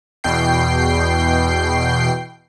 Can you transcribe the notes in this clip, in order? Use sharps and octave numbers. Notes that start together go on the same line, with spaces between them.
E2 B2 G5 C7